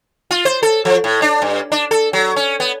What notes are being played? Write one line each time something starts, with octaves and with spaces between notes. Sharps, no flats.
F4
C5
A4
F3
A2
D4
G2
D4
A4
F#3
C#4
B3